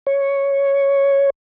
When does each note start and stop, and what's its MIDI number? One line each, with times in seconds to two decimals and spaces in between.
0.07 1.30 73